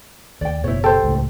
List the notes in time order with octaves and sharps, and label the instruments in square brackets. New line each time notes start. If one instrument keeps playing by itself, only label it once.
[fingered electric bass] D#2 [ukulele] D5 G5
[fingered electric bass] F#1 B2 [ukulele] E4 C5 C#5
[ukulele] G4 [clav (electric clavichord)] A4 C5
[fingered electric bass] C#2 A2